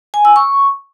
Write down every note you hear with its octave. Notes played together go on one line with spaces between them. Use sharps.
G#5
E6
C#6